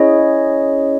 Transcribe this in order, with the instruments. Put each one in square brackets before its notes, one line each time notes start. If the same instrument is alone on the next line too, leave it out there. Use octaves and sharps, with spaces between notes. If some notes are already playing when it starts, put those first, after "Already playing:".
Already playing: [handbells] C#4 E4 G#4 C#5 D#5